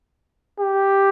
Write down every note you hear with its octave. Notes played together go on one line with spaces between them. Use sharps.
G4